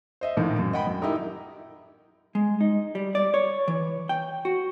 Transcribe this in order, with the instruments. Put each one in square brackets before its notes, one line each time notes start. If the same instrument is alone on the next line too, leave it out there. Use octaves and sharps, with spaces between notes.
[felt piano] C5 D#5 E5
A#1 A2 D#3
F#2
D#5 F#5 G5 B5
F#2
D#4 E4 G4 A#4
[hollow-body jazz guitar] G#3
D#4
G3
D5
C#5
E3
G5
F#4